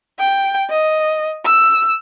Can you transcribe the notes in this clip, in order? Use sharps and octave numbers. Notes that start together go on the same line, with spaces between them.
G5
D#5
E6